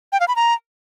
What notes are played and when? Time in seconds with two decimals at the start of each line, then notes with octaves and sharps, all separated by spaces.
0.12 G5
0.20 F5
0.28 B5
0.36 A#5